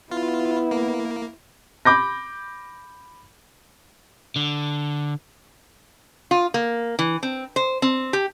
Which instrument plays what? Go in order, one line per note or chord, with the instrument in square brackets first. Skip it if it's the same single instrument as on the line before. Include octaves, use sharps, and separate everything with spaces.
[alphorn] B3 [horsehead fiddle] E4 [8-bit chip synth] F4
[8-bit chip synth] A#3
[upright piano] B5 D6 G6 A#6
[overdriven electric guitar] D3
[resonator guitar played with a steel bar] F4
A#3
E3
C4
C5
C4
G4